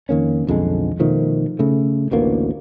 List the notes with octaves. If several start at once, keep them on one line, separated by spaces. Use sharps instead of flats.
F2 D#3 A#3 C#4
B1 F2 D3 G#3
B2 D#3 F3 A3
C#3 A3
A1 D2 A#3 B3